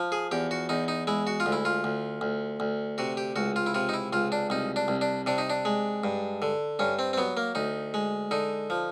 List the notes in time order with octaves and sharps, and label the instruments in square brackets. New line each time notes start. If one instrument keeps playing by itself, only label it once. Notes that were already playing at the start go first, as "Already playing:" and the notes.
Already playing: [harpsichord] F3
G#4
E2 G4
F#4
E2 D#4
D#4
G#3 E4
F#4
F4
D2
E4
F4
D2
D2
D2
C3 F#4
G4
C#2 F#4
F4
E4
C3 F4
D#4
E4
C#2 F4
D4
C2 D#4
D4
C2
D4
C3 D4
D#4
D4
G#3
G2
D3
G2 C#4
C4
C4
F#3 B3
A#3
D2 D#4
G#3
D3 D#4
F3